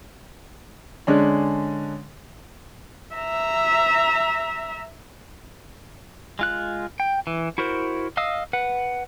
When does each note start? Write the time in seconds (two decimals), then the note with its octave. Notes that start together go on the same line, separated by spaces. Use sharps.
1.07 D3 G#3 C#4 D4
3.16 E5 A#5
6.39 G#3 F4 F#6
7.00 G5
7.27 E3
7.58 E4 F#4 A#4 C5
8.17 D#5 F5 D#6 E6
8.53 B4 F#5